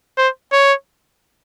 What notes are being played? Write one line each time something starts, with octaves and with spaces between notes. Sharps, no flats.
C5
C#5